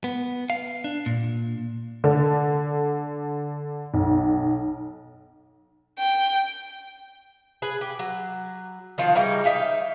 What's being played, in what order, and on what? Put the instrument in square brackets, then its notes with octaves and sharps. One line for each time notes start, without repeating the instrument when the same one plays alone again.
[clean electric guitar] B3
F5
D4
A#2
[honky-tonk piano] D3
B1
[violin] G5
[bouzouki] G#4 B4
G4
F#3
D#3 F3 F4 F#4
C#3 E3 G3 D#4
D#4 E5 F5 G5